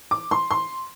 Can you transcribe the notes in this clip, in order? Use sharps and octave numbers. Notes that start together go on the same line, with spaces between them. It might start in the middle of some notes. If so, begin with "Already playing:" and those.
D6
C6
C6